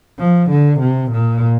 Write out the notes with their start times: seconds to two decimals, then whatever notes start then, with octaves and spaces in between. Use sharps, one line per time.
0.18 F3
0.50 D3
0.80 C3
1.11 A#2